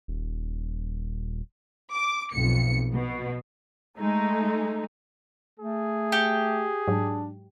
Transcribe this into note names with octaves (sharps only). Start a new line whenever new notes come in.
D#1
D6
B1 F2 C#7
B2
G#3 A3 D#4
A3 G#4
G4 C#7
G#2 F#3 D4